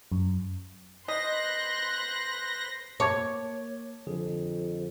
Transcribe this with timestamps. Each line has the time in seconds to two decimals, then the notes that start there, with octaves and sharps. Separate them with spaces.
0.12 F#2
1.08 B4 C5 D#5 C6 F#6 A#6
3.00 A#3 C#5 A5 D6 G#6
4.07 F2 D3 G#4